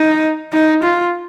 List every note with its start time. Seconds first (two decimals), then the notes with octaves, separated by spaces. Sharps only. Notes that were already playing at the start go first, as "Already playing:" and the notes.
Already playing: D#4
0.53 D#4
0.83 F4